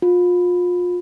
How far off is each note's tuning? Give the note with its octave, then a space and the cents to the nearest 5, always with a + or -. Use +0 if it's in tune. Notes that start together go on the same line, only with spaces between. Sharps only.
F4 +30